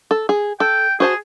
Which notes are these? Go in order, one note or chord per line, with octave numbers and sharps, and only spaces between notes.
A4
G#4
A4 G5
F#4 G#4 C5 A5